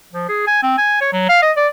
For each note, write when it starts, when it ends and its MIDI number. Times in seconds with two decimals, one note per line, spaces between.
0.13 0.28 53
0.29 0.45 68
0.47 0.59 80
0.63 0.77 60
0.78 0.99 80
1.01 1.08 73
1.13 1.24 54
1.29 1.39 77
1.43 1.52 75
1.57 1.67 74